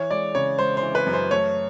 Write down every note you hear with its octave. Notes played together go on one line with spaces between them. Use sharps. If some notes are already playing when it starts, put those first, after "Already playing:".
Already playing: E3 C#5
G#3 D5
C#3 C#5
G#3 C5
C5
E3
B4
F#2
C5
A3 C#5